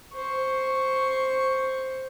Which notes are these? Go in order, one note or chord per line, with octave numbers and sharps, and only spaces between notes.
C5 C#6